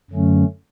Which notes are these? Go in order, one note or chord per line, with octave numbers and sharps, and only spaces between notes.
F#2 D3 F#3 A3 C#4